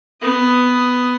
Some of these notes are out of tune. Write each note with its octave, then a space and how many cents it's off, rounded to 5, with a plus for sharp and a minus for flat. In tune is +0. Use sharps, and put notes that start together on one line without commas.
B3 +10 D#6 +0